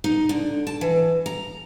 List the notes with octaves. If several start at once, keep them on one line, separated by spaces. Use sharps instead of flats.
D#4
D3
A5
E3
A#5